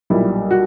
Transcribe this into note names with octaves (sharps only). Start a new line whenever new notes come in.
B1 A#2 G3 E4
F#4